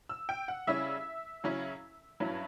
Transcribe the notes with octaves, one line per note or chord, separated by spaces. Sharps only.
E6
G5
F#5
C#3 G3 C#4 E4 E5
C#3 F#3 C#4 E4
G2 F#3 C#4 E4